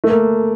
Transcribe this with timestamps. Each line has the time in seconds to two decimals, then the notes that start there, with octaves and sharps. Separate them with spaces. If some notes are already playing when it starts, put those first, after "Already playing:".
0.04 A3
0.10 A#3